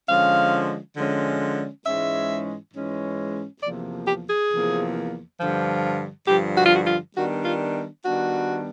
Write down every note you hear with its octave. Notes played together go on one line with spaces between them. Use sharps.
D3 F3 G#3 C#4 F5
D3 F3 G#3 C#4
G#2 E3 G#3 C#4 E5
G#2 E3 G#3 C#4
E2 C3 F3 A#3 D5
G4
G#4
E2 C3 F3 A#3
G2 D3 F3
G2 D3 F3 G4
F#4
F4
F#4
F4
D#3 G3 B3 D4 F#4
F4
D#3 G3 B3 D4 F#4